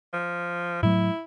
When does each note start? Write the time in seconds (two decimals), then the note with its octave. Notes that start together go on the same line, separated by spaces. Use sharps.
0.13 F3
0.83 A2 F#3 A3 E4